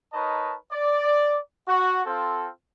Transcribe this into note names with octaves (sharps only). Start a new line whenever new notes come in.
D#4 A#4 B4 C#5 D#5 A5
D5
F#4
C4 F4 A4